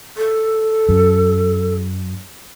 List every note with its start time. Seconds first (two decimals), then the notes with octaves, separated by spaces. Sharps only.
0.17 A4
0.89 F#2